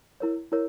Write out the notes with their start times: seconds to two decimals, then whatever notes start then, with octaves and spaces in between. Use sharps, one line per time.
0.20 E4 A#4 C#5
0.52 E4 A#4 C#5